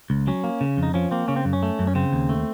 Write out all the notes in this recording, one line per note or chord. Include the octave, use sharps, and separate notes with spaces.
C#2
F#3 C#4
A#3
C#3
F2
D#4
F3 C#4
A#3 C4
C#3 C#4
C4
F#2
C#4
A3
F#2
C#4
C#3 C4
D#2
A3